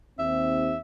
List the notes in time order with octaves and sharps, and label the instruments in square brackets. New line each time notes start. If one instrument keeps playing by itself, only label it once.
[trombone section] D#2 C4 [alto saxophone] E5